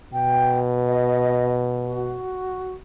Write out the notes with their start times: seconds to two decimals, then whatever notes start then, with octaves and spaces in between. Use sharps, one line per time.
0.13 B2 G5
0.88 D#5
1.86 F#4